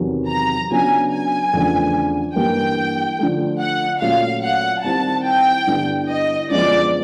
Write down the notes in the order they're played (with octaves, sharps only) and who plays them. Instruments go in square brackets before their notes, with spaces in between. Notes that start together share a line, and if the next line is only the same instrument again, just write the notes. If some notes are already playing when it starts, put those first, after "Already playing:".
Already playing: [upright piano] E2 C3 D#3 F#3
[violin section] A#5
[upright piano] C#3 F#3 B3 D4 [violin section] G#5
[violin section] G#5
[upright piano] E2 C#3 F3 A3 D4
[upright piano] G2 E3 G3 A#3 [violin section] G5
[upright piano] D3 F3 A3
[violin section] F#5
[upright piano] A#2 F#3 A3 C#4 [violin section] F5
[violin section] F#5
[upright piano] D#3 G3 C4 E4 [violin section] A5
[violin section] G5
[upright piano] G2 D3 G3 B3 E4
[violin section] D#5
[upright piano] F#2 D3 F3 G#3 B3 [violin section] D5